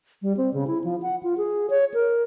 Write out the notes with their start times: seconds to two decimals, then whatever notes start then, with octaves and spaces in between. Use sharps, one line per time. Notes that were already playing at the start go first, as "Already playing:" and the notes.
0.22 G3
0.37 C4
0.54 C#3
0.67 E4
0.84 F3
1.02 F#5
1.23 F4
1.38 G#4
1.70 C#5
1.94 A#4